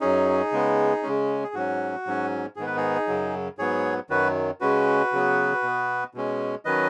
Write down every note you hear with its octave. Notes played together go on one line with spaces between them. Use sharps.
F#2 F#3 C#4 D#4 G#4
C#3 G#3 B3
C#3 G#3 C#4
G#4
G#2 F#3 C#4 F#4
G#2 F#3 C#4
G#2 D#3 B3 G#4
B4
D#4 G#4
F#2 C#3 F#3
G#2 F#3 B3 G#4 C#5
F#2 D#3 F#3 F#4 B4
C#3 G#3 C#4 F#4 B4
C#3 F#3 B3
B2 B3
B2 G#3 C#4
D#3 F#3 C#4 B4 D#5